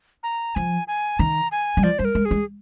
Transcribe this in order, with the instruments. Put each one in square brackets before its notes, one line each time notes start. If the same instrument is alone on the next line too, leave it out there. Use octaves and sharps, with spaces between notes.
[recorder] A#5
[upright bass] F3 [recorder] G#5
[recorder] G#5
[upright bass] D#3 [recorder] A#5
[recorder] G#5
[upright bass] G3
[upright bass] F3 [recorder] D5
[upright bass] G3 [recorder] C5
[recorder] A#4
[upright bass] G#3
[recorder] G#4
[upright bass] G#3